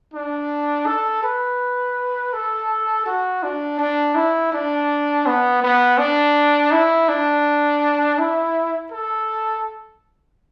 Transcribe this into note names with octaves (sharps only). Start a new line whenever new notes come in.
D4
A4
B4
A4
F#4
D4
D4
E4
D4
B3
B3
D4
E4
D4
E4
A4